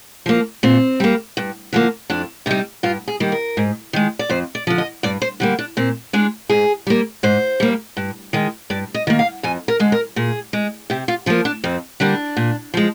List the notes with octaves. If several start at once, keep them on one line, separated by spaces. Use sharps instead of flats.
F3 A#3
A#2 C4
G3 A#3
G2
D3 F3 A#3
F2 D4
C3 G3 D#4
G2 F4
G#4
D#3 G3 A#3
A#4
G#2
D#3 G#3
D5
F2 C5
D5
D3 F3
D#5
G2 D5
C5
D3 G3 A#3
D4
A#2 C4
G#3 D4
G#2 G#4
G3 A#3
G#2 C5
G3 A#3
G2
D#3 G#3
G2 D5
D#5
D#3 A#3
F5
F2 G#5
A#4
D3 G#3
A#4
A#2 G#4
G#3
C3 G4
F4
F3 A#3 F4
D4
F2 C4
D3 G3 A#3 D4
A#2
F3 G#3